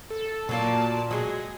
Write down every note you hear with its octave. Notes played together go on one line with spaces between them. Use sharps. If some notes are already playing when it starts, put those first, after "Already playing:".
A4
A#2 F#3 A#3 F4 D5 A5
F#3 G#3 G#4